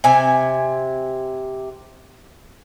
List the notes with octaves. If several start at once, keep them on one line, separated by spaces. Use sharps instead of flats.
C3 G#5